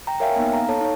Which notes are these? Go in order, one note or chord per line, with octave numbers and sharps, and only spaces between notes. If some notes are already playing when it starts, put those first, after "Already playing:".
G5 A#5
A#4 C#5 E5 F5 G5 G#5
A#3 B3 D#4
F5 A#5
A4 C#5 A5
D#4 C#5